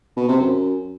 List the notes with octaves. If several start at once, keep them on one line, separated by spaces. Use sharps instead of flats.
B2
C3
F#2